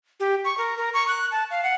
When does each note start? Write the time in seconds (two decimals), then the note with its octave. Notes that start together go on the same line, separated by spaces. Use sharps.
0.20 G4
0.45 C#6
0.58 A#4
0.77 A#4
0.94 C#6
1.08 F#6
1.31 A5
1.51 F5
1.63 F#5